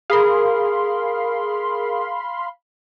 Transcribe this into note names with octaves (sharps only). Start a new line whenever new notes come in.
G#4 A#4 F5 B5 C6